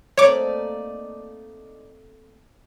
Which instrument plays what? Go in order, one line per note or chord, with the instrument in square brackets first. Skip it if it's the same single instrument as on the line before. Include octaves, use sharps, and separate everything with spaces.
[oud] A3 A#3 C4 [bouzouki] D#4 D5 [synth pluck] C#5 D6